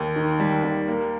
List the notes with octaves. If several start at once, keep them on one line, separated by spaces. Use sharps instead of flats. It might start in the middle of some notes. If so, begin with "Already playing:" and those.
Already playing: D#2
D#3
G3
D#2
A#3